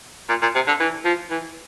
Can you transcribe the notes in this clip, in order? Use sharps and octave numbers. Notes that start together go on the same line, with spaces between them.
A#2
A#2
C3
D3
E3
F3
E3